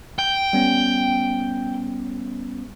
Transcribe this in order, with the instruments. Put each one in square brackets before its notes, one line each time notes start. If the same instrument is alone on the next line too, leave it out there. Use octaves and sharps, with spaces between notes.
[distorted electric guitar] G5
[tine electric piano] G3 B3 C#4